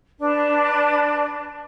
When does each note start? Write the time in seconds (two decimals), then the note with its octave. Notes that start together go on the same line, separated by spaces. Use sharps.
0.19 D4 B4